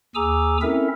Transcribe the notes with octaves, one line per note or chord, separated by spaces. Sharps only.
D#2 G#4 G#5 A#5 D6 E6
C4 C#4 E4 A4 A#4 E5